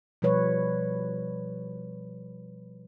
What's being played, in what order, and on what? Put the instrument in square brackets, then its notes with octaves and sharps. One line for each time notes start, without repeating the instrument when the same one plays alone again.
[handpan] B2 F3 G3 B4 C#5